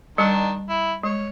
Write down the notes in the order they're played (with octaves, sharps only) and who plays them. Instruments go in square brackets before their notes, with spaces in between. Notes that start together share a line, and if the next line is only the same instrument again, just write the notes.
[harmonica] D#3 D4 [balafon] G3
[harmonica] E4
[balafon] G#3 [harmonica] C#5